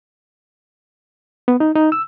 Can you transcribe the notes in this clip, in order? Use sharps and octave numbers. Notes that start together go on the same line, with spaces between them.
B3
D#4
D#4
E6